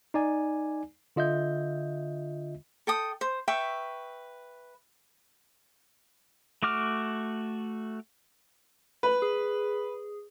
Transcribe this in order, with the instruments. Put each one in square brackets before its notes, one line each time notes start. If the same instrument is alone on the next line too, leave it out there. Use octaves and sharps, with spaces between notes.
[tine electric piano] D#4 D5 G#5
D3 F4 D#5 E5 G6
[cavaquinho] A4 G5 D#6
C5
B4 E5 G5 C#6
[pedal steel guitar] A3 F#4 D6 F6
[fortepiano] B4 [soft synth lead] B5
[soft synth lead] G#4